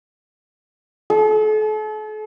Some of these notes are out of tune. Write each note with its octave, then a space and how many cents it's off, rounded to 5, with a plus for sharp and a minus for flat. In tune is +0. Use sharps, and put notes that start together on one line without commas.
A4 -40